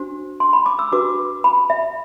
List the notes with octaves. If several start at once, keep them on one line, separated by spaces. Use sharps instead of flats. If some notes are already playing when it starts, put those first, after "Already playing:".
Already playing: D4 F#4 C5
C6
B5
D6
E6
D4 F#4 B4 D6
B5
E5